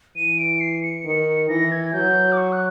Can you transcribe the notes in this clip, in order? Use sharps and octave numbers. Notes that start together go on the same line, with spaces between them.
E3 D#7
D7
C7
C#7
D#3
E3 A#6
G#6
F#3 G6
D6
C#6
F#6